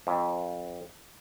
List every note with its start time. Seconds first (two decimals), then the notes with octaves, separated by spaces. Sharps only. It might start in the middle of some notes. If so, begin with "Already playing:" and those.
0.07 F2